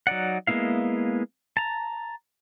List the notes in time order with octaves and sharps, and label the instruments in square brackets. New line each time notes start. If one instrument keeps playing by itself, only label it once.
[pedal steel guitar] F#3 D#4 D5 F#5
G#3 A#3 B3 E4 F5
A5 A#5